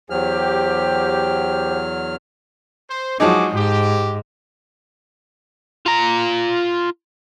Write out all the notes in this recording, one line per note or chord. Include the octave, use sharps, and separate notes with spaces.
E2 F#3 G4 C5 F6
C5
F3 F#3 G#3 D#4 G#4 D6
G#2 G4
F4 A#5